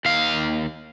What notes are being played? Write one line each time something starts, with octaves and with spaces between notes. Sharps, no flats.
D#2 F5